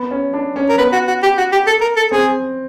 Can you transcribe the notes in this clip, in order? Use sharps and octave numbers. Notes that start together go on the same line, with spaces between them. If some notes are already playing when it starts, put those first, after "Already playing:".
Already playing: B3
C#4
D4
C#4
A#4
B3 B4
F#4
F#4
G4
F#4
G4
A4
A#4
A4
C4 G#4